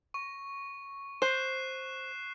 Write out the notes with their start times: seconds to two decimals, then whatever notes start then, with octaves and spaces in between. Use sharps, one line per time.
0.14 C#6
1.22 C5 F#6 C7 E7